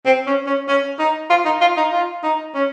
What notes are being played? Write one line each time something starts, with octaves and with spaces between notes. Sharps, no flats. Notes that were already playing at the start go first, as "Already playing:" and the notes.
C4
C#4
C#4
C#4
D#4
F4
D#4
F4
D#4
F4
D#4
C#4